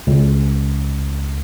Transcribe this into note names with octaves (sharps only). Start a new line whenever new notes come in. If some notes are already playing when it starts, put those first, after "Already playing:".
C#2